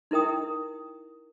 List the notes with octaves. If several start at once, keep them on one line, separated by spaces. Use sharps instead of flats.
D#4 E4 A#4 G5 D#6